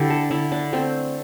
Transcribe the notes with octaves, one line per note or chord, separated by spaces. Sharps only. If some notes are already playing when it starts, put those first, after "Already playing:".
Already playing: D3 E4 G4
A4
D3 E4
D4
A3 C4